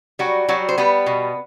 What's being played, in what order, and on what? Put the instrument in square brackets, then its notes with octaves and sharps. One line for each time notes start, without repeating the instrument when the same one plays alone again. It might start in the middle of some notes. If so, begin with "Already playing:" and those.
[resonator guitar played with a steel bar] F#3 G3 F#4
F#3 G3 F#4
C5
G3 B3 B4
B2